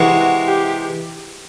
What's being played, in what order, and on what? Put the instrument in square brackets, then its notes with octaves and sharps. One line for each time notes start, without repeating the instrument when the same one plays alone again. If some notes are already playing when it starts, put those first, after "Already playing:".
Already playing: [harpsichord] C3 E3 G#3 [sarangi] F#4
[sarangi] G4